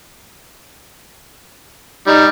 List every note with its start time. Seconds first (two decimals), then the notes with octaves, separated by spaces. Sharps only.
2.07 G3 D#4